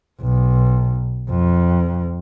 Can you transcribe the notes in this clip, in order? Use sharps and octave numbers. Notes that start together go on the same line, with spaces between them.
B1
F2